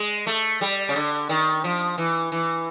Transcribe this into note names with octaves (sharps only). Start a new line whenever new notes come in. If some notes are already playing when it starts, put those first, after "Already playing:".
Already playing: G#3
A3
G3
C#3
D3
D#3
F3
E3
E3